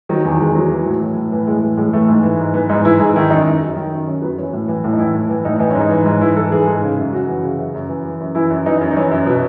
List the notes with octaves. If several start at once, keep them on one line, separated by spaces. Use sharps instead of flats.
D#3 F#3
E2
E2 G#3
F#3
E3
A2
E3
A2
E3 B3
A2 G#3
E3
A2 G#3
E3 A3
G#2
E3
G#2
E3 B3
G#2 D#4
E3 E4
G#2 G#4
D#3 E4
F#2 D#4
F#2
F#3
D#3
F#2
F#2 C#4
F#3 B3
E3 C#4
A2
E3
A2
D#4
E3 E4
A2
E3
A2 D#4
E3 D#4
C#4
G#2
D#4
E3
G#2
E3 E4
G#2 A4
E3 G#4
G#2
C#3
F#2
F#2 F#4
E3
C#3
F#2
F#2
E3
E3
F#2
E3 E4
F#2
E3 D#4
F#2
D#4
E3 C#4
F#2
B2 B3